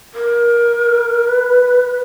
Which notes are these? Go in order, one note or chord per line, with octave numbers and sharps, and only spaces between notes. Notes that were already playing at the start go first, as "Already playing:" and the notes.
A#4
B4